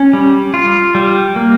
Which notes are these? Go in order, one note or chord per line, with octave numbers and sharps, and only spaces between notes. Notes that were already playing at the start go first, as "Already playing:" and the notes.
Already playing: C#4
G3
F4
G3
A#3